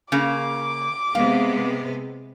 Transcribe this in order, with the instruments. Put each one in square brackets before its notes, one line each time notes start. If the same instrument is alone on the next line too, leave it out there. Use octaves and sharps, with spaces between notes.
[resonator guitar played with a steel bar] C#3 A#3 [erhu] D6
[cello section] C3 G#3 B3 [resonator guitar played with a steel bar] F5